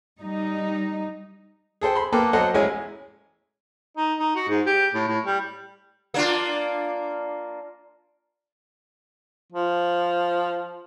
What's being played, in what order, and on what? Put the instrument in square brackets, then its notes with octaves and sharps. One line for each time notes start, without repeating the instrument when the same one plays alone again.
[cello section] G3 D#4
[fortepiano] G#4 A4 C5 G5
B5 C6
A#3 A4 B4 G5 D6
F#3 A4 C5 D#5 F#5
A1 G#3 C#4 E4 C#5 G#5
[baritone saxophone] D#4
D#4
F#4
G#2
G4
A2
A2
G3
[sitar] A#3 D4 F4
[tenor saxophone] F3